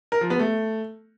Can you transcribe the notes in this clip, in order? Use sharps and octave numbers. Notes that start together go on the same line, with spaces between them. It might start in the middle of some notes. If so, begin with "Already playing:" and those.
A#4
F3
B3
A3